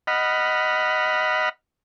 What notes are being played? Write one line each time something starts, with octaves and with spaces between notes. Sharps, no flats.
D#5 F#5 B5 F6